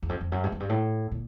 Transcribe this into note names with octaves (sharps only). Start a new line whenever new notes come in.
E2
F2
F2
F#2
G2
F#2
G2
A2
A#2